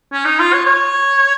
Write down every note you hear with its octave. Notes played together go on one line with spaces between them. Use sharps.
C#4
D#4
F4
C#5
C#5